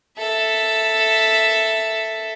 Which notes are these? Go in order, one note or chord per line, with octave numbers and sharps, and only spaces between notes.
A4 E5